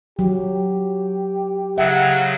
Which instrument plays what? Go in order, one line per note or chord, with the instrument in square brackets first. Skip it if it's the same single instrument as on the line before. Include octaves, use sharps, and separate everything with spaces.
[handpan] F#3 [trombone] G4
[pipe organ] C#3 F#3 [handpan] E5 [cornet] F#5